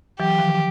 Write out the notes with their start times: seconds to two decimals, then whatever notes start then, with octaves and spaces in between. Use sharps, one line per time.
0.20 E3 F#3 G4
0.38 D#3 F3